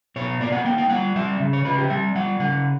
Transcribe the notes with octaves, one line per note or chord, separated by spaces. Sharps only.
B2 C#5
A#3 D5
F#5
A#3 G5
G5
G3 F#5
G3 E5
C#3
C#5
C#3 B4
G4
G3 E5
G3 F#5
C#3 F#5